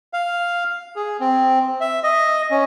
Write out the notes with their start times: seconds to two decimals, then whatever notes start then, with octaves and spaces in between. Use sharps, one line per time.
0.13 F5
0.96 G#4
1.20 C4
1.81 E5
2.03 D#5
2.51 C#4